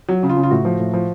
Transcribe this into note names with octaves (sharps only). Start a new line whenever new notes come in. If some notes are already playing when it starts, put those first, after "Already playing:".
F#3
C#3
F4
C#3
F4
A2 F#4
F3
A2
F3